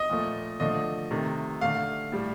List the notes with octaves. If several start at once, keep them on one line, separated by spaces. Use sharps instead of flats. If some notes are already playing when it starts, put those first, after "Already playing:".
Already playing: D#5
A#2 F3 A3
D3 F3 A3 D#5
C3 D#3 A3
D3 A3 F5
A2 G3